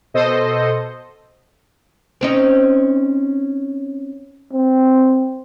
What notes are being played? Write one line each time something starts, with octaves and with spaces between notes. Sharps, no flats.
B2 A4 C5 D#5
C4 C#4 D#4
C4